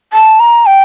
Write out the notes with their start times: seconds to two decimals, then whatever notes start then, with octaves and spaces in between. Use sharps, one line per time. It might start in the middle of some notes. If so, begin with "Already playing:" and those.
0.13 A5
0.40 A#5
0.66 G5